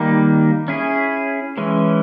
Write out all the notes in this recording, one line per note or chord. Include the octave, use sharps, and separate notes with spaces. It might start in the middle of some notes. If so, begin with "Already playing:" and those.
Already playing: D#3 G3 A#3 D#4
C#4 E4 G#4
E3 G#3 C#4